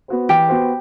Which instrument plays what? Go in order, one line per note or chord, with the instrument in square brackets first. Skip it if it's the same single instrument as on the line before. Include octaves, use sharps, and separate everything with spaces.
[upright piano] B3 F#4 C5
[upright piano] E3 [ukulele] G4
[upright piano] B3 F#4 C5